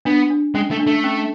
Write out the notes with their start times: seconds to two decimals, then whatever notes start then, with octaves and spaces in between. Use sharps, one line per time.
0.05 B3 D4
0.30 D4
0.55 G#3 C#4
0.71 A3
0.79 D4
0.87 A3
1.04 C#4